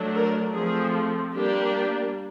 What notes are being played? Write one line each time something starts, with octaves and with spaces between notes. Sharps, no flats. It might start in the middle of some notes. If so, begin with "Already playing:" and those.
Already playing: F#3 A3 D4
A#4
F3 A3 C4 G#4
G3 A#3 D4 G4